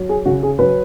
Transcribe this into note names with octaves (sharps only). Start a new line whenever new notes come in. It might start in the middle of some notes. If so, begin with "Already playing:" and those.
Already playing: F#3
G#4
C#3 F#4
G#4
F#3 B4